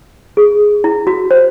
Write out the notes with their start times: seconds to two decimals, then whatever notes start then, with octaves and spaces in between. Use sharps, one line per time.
0.37 G#4
0.84 E4
1.07 F#4
1.31 C5